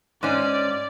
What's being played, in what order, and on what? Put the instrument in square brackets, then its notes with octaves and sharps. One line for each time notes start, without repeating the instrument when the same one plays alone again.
[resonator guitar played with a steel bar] G#2 C#4 [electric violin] D5